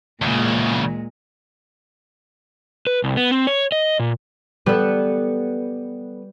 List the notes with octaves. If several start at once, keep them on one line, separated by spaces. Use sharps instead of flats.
E2 A#2 C#3 G#3
B4
C2
B3
C4
C#5
D#5
A#2
G3 B3 A4 B4